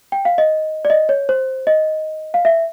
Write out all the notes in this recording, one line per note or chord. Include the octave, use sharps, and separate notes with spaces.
G5
F5
D#5
D5
D#5
C#5
C5
D#5
F5
E5